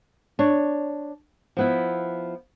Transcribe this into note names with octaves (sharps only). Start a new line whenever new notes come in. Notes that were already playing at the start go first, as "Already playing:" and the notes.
D4 C#5
F3 B3 E4